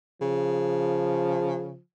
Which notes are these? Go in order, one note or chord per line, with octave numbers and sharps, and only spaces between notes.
C#3 F3